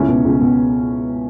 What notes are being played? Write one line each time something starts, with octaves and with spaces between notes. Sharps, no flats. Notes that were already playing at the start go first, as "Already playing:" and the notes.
Already playing: C#2 C#4 E4
B2
C#2
B2